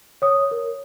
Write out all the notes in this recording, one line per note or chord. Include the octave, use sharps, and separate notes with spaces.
C#5 D#6
A#4